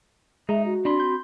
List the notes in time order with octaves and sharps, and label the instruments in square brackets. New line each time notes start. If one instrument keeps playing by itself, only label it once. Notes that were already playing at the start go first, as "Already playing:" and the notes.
[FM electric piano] G#3 [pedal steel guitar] D#4 A#5 [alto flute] E5
[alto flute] F#4
[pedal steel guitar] C4 B5 C6 [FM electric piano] D4
[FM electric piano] G6